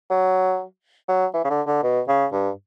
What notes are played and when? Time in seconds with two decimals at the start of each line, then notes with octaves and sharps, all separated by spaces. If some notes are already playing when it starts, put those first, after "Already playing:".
0.10 F#3
1.09 F#3
1.34 E3
1.45 C#3
1.50 D3
1.67 D3
1.83 B2
2.08 C#3
2.32 G2